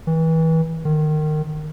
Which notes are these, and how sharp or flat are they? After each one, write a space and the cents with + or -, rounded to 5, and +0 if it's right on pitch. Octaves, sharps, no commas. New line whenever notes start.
E3 -30
D#3 -25